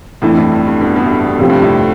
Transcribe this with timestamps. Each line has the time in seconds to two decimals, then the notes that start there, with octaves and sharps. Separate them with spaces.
0.22 F2 A2 E3 A3 D4
0.37 F2 A2
0.52 G2
0.67 G2
0.81 G2 B2
0.96 G2 B2
1.06 A2
1.11 G2
1.26 B2
1.38 A2 C3 F3 C4 G4
1.49 G2
1.62 F2 A2